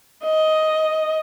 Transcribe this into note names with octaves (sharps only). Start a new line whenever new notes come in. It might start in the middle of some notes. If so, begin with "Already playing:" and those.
D#5